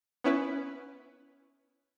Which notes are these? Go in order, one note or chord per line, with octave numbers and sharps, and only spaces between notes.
B3 C#4 E4 B4